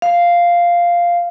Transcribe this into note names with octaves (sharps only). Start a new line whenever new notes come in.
F5